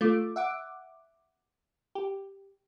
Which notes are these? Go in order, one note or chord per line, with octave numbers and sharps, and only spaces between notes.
A3 F4 D6
E5 F#5 D6
G4